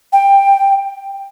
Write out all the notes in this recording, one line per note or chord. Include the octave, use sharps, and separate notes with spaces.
G5